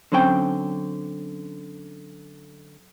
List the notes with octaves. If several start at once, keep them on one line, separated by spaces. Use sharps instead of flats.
D3 F#3 C4 C#4 G5